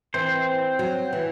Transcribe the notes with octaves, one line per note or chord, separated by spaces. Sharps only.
E3 C4 C5
F#3
E3